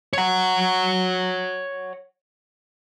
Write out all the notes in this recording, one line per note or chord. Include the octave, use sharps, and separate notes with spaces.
C#5 F#5